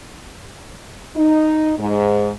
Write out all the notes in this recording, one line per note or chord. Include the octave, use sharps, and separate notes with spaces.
D#4
G#2